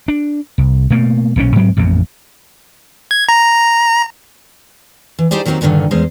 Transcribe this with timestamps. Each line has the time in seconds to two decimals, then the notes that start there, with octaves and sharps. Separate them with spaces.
0.08 D4
0.58 C2
0.90 B2 A3 A#3
1.36 B1 A#2 D3 C#4
1.56 G#2 F#3 G#3 C4
1.77 A1 F2 A#2
3.11 G#6
3.29 A#5
5.19 E3
5.31 D#4 E4 G4 G#4 C5 D5
5.45 D#3 F#3 A#3 C4 D#4 G4
5.61 D2 G2 A#2 D3 D#3
5.91 E2 G#3 C#4 C5